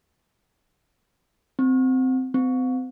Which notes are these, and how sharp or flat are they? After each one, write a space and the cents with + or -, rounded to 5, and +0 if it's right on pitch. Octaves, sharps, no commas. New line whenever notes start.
C4 -15
C4 -40